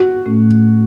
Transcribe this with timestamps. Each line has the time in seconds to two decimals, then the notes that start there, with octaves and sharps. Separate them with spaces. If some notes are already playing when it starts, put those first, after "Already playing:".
Already playing: F#4
0.26 A2 A3 C#4